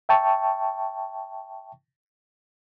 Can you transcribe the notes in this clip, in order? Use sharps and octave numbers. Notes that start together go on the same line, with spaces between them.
E5 G5 A5 C#6